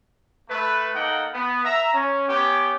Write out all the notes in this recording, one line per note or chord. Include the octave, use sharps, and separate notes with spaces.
A3 B4
A#3 D#4 A4 F#5 G5
B3
E5 A#5
C#4
B3 C#4 G4 C#5 G5